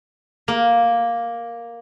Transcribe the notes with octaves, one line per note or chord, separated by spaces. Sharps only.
A#3